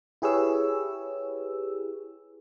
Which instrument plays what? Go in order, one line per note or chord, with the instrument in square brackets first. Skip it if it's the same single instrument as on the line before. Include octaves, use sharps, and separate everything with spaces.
[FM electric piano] E4 G4 G#4 B4 C#5 E6